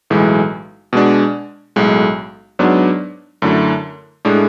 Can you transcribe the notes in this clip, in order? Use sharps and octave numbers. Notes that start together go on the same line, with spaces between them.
B1 A2 E3 G#3
B2 G#3 D4
B1 A2 G#3
G#2 F#3 B3 D4
F#2 D3 A3 E4
A2 G#3 D4